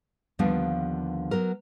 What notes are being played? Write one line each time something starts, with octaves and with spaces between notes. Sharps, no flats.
D#2 D3 F3 G3 B3 D4
F#3 B3 A#4